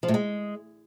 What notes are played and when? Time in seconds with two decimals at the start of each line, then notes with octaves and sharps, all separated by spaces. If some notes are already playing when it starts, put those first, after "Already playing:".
0.03 F3
0.08 A2
0.14 G#3